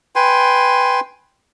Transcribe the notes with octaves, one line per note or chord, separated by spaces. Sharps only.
B4 G5 G#5 C6